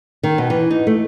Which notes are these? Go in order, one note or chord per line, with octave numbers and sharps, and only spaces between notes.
D#3
B2
E3
D#4
A3